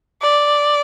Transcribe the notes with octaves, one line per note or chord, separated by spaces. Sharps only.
D5